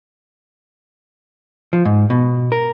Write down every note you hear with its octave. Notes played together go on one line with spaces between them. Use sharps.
F3
G#2
B2
A#4